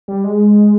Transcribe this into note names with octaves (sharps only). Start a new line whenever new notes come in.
G3
G#3